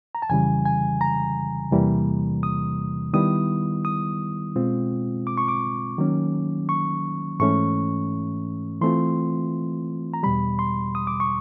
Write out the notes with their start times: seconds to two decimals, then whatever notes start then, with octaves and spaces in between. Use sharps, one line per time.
0.15 A#5
0.22 A5
0.29 F2 C#3 E3 G3 G#5
0.65 G#5
1.01 A#5
1.71 E2 C3 E3 G3 A#3
2.43 D#6
3.13 D#3 G3 B3 E4 D#6
3.85 D#6
4.56 B2 G#3 C4 F4
5.27 D6
5.38 C#6
5.48 D6
5.98 D#3 F#3 A#3 C#4
6.69 C#6
7.40 G#2 E3 A3 C#4 C#6
8.82 E3 A3 C4 F4 C6
10.14 A#5
10.23 E2 B2 G3 B5
10.59 C6
10.95 D#6
11.07 D6
11.20 C#6